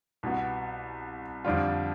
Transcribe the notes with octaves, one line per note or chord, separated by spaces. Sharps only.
C2 B2 B3
F2 D3 G3 D4 F4